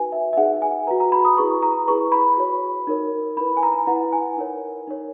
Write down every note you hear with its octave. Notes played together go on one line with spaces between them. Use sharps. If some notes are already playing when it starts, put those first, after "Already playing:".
Already playing: D#4 F#4 B4 G#5
E5
E5
D#4 G#4 B4 F#5
G#5
F#4 B4 A#5
A#5
B5
D#6
E4 G#4 B4 C#6
A#5
E4 G#4 B4 C#6
B5
F#4 C#5
D#4 A#4 C#5
E4 B4 B5
G#5
A#5
E4 B4 F#5
G#5
D#4 A#4 C#5
D#4 A#4 C#5